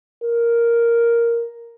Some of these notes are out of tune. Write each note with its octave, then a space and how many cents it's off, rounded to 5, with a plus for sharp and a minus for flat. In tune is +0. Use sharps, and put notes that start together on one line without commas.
A#4 +0